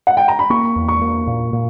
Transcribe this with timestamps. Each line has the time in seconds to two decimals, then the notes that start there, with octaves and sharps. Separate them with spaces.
0.07 F#5
0.17 G5
0.28 A#5
0.39 B5
0.50 A#3 C#6
0.76 E2
0.88 C#6
1.02 A#3
1.27 A#2
1.53 A#2